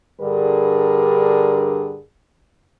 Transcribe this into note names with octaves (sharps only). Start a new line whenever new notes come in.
G2 D3 G3 G#4 A#4